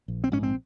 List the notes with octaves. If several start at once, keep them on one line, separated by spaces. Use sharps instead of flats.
A#1
C4
G#2 C#4
C4